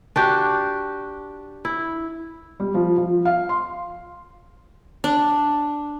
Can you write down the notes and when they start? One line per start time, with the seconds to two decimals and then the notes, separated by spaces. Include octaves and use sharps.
0.16 D4 F#4 G4
1.65 E4
2.60 G3
2.74 F3
2.97 F3
3.25 F5
3.49 C6
5.04 D4